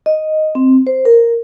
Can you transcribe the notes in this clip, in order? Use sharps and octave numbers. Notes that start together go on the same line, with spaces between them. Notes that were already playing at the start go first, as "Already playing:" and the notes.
D#5
C4
C5
A#4